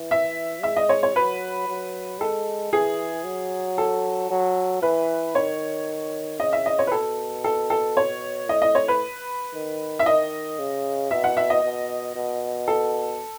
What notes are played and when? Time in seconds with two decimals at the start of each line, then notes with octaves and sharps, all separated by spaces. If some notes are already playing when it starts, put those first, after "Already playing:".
Already playing: E3
0.11 E5
0.63 G#3 E5
0.76 D#5
0.89 C#5
1.03 C#5
1.15 F#3 B4
1.68 F#3
2.20 G#3 A4
2.73 E3 G#4
3.25 F#3
3.78 A4
4.30 F#3
4.82 E3 B4
5.35 D#3 C#5
6.40 C#3 D#5
6.53 E5
6.66 D#5
6.79 C#5
6.87 B4
6.91 B2 A4
7.44 A4
7.70 A4
7.97 C#5
8.49 A2 D#5
8.62 D#5
8.75 C#5
8.88 B4
9.54 D#3
9.99 E5
10.06 D#3 D#5
10.59 C#3
11.11 B2 E5
11.24 F#5
11.37 E5
11.50 D#5
11.64 B2
12.15 B2
12.68 A4